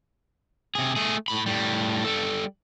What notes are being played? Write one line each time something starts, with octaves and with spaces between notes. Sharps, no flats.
C3 G#4
A3 G#4
A2 B5
A2 G3
G3 A4